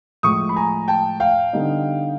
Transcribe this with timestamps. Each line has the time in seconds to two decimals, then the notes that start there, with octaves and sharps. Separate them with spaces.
0.23 A2 F3 G#3 C#6 D#6
0.49 B5
0.56 G#5 A#5
0.88 G5 A5
1.20 F5 G5
1.53 D3 G3 B3 D#4